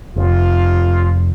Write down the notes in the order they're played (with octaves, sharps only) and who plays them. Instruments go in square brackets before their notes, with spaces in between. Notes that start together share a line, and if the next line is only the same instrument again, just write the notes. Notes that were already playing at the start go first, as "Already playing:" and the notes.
[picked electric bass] F1 [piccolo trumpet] F4